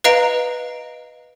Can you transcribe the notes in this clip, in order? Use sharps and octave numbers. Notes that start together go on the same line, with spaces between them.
B4 D#5 F5 A#5 D7